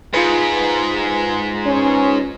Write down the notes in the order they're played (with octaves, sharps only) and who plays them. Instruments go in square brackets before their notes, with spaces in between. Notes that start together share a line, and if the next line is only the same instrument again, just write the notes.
[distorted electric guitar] G#2 [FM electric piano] F4 B4
[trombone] C#4